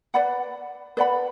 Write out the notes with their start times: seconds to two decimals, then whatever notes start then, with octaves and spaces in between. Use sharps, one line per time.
0.14 B4 D5 F#5 B5
0.97 B4 D5 F#5 B5